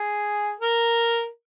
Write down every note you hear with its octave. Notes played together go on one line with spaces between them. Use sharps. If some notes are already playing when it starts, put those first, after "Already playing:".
Already playing: G#4
A#4